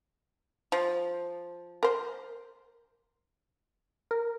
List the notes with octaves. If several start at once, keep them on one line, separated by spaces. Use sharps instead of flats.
F3
A#4 C5
A#4